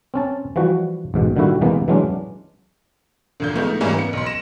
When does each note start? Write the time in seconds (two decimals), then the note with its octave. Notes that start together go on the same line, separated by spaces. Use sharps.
0.14 C4 C#4 A5
0.56 E3 F3 G3 F#4
1.14 A1 G#2 B2
1.36 A#2 D3 D#3 G3 E4 F#4
1.61 C3 E3 G#3 A#3 B3
1.88 E3 F#3 G#3 C#4 D4
3.40 D2 A#2 G6
3.54 F3 G#3 A3 B3 D#4 E4
3.81 G#2 E3 G3 A#3 C#4 E4
3.95 B3 C#7
4.13 B1 C6
4.26 A#6 E7